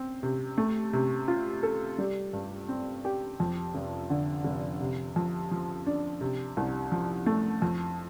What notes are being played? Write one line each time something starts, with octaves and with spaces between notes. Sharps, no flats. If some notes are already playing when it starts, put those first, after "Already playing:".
Already playing: C4
C3
A3
C3
F4
A4
G3
G2
C4
G4
F2
F1
D3
F1
C3
F2
F3
D4
C3
C2
F3
A3
F2